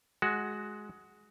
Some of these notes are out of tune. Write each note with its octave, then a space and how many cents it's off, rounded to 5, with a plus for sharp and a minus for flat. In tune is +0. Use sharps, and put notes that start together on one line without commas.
G#3 +15 F#4 +5